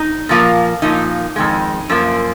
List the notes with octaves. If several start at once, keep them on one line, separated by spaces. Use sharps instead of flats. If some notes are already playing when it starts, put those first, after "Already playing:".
Already playing: D#4
A#2 F3 A#3
A#2 F3 A#3 D#4
F2 D#3 G#3
F#2 F3 A#3